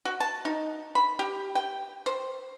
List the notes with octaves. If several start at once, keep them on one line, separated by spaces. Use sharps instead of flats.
F#4
A5
D#4
B5
G4
G5
C5